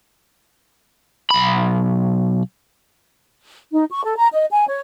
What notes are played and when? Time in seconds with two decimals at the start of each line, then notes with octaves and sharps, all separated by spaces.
1.31 B1 B5
3.72 D#4
3.91 C#6
4.05 A4
4.18 A#5
4.33 D#5
4.50 G#5
4.67 C#5